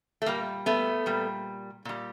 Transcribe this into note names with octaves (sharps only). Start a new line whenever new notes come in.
A3
A#2 G3 A#3
A3 B3
A#2 G3
A#2 G3